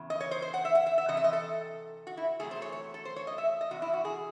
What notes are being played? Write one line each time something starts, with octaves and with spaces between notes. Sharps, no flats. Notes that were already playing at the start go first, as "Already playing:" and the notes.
Already playing: E2 C#3
D#5
C#5
C5
C5
F#5
E5
F#5
E5
E5
C3 E3 D#5
E5
D#5
A4
F#4
E4
E2 C3 F#3 A3 G#4
C5
C#5
C#5
A4
C5
C#5
D#5
E5
D#5
E2 C3 F#4
E4
F#4
G#4